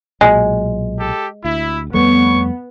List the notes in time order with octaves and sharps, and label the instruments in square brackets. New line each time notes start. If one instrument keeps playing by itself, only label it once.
[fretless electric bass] B1 A#2 F#3 [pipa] G#3
[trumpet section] G4 A4
[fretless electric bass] D2 [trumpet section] E4
[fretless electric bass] F2 G3 A3 [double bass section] B3 [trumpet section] C#5 C#6